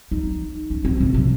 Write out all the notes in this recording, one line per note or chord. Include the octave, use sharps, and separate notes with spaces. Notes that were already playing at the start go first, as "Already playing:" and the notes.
D#4
C#4
C4
C#3
C3